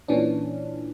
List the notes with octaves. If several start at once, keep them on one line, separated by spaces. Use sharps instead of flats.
A#2 E3 C#4 D4